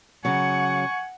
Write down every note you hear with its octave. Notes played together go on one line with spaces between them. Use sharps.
C#3 F#3 F#5 G#5 C#6